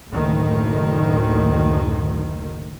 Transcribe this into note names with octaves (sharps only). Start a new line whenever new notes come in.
F#1 D2 A2 D#3